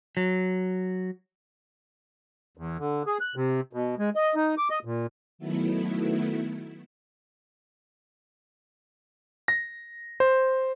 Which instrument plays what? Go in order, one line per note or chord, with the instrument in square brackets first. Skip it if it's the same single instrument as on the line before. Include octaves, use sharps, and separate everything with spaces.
[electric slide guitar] F#3
[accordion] E2
D3
G#4
F#6
C3
B2
G#3
D#5
D#4
D6
D#5
A#2
[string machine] D#3 F#3 A3 B3 E4
[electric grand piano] A#6
C5